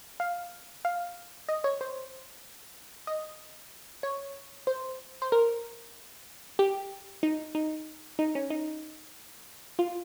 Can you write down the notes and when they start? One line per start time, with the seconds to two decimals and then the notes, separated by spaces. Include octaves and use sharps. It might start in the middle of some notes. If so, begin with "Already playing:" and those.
0.20 F5
0.85 F5
1.49 D#5
1.64 C#5
1.81 C5
3.07 D#5
4.03 C#5
4.67 C5
5.22 C5
5.32 A#4
6.59 G4
7.23 D#4
7.55 D#4
8.19 D#4
8.35 C#4
8.50 D#4
9.79 F4